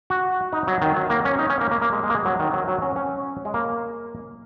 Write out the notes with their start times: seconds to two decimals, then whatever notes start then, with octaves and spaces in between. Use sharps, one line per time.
0.10 F#4
0.53 D#4
0.67 F#3
0.82 D#3
0.96 F#3
1.10 A#3
1.25 C#4
1.39 D#4
1.50 C#4
1.61 A#3
1.71 A#3
1.82 A#3
1.93 G#3
2.03 G#3
2.10 A#3
2.15 G#3
2.25 F#3
2.39 D#3
2.53 F#3
2.68 F#3
2.82 C#4
2.96 C#4
3.45 G#3
3.54 A#3